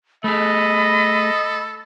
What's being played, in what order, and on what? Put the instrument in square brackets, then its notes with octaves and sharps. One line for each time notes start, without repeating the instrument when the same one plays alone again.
[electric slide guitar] A3 G#4 [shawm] A4 [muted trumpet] D#5 [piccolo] B5